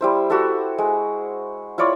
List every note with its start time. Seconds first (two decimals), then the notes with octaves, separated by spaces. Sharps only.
0.01 G3 E4 C5
0.30 F#4 G4 A4 E5
0.78 G#3
1.78 E4 F4 C#5 D5